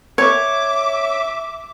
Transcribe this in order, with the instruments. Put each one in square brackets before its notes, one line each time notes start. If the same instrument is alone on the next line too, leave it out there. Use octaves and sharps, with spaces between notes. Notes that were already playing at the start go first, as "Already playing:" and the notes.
[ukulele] C#5 [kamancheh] E5 D6